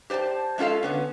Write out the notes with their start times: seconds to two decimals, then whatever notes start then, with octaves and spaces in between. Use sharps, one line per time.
0.10 G4 C5 D5 G5 A5
0.58 G#3 C#4 F4 A4 F5
0.83 D3 B3 C#4